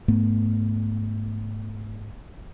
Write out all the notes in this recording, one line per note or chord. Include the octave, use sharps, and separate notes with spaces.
G#2 A3 B3